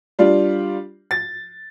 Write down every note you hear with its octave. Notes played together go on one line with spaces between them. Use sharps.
G3 D4 F4
A6